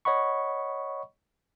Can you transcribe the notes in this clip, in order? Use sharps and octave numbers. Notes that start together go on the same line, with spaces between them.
C#5 D#5 F#5 B5 C#6